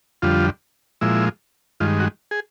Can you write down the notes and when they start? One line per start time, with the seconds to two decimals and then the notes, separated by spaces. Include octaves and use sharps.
0.22 F2 D3 G3 F4
1.01 A#2 F3 G#3 E4
1.80 G2 D#3 G#3 F4
1.99 F#4
2.31 G#4